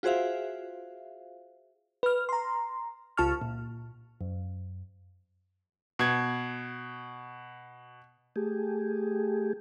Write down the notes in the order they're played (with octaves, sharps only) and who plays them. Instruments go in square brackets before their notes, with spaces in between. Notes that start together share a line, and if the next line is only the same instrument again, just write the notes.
[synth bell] F4 F#4 G#4 C5 E5 F5
[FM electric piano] B4 F6
A#5 C6
C#2 F4 A5 C#6 F6
A#2
F#2
[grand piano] B2 G#6
[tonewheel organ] A3 G4 G#4